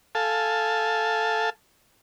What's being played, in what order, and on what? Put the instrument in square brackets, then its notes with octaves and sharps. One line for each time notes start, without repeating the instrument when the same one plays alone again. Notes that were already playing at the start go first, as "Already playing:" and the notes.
[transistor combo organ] A4 F5 G#5 A5